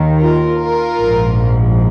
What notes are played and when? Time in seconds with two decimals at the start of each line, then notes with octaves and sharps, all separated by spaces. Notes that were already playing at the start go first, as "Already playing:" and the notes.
Already playing: D#2 D#3
0.20 F4 A#4
0.61 F4 A#4
1.01 A#1 G#2 F3